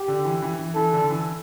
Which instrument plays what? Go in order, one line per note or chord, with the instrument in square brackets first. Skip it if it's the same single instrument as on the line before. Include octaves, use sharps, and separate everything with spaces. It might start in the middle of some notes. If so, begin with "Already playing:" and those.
Already playing: [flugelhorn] G4
[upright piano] D3
E3
E3
E3
[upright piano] E3 [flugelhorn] A4
[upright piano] D3
E3